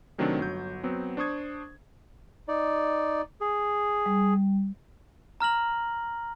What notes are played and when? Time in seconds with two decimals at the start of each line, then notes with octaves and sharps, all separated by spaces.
0.18 C3 D#3 F#3 A3 C4 D4
0.38 G1 F#3 G6
0.84 F#3 B3 C4
1.17 D4 C5 C#6 D#6 G#6
2.48 D#4 D5
3.41 G#4
4.06 G3
5.40 A#5 F6 A#6 F#7